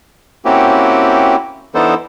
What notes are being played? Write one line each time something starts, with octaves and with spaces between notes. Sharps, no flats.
A#3 C4 C#4 E4 F#4 G4
E3 B3 D4 D#4 A4 C5